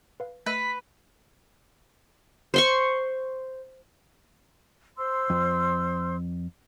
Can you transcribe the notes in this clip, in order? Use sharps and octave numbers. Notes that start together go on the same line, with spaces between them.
B4 F5
A3 B4 D#5 E6 B6
C5 C6 C#6
C5 C6 E6
F2